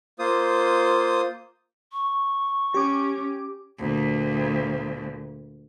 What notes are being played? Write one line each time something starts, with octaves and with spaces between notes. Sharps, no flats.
A#3 F4 C5 D#6
C#6
C#4 G4 D6
D2 A#2